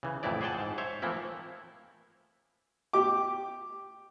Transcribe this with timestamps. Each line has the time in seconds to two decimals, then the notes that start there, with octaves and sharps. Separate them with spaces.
0.03 C#3 E3
0.23 F2 A2 C#3 E3 E4 D5
0.41 G#4 C5 F#5 G5 A5
0.59 G#2
0.78 C5 C#5 E5
1.02 E3 F3 A3 A#3 C4 E4
2.93 G4 D6